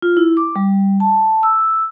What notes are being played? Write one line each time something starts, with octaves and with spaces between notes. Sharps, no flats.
F4
E4
D6
G3
A5
E6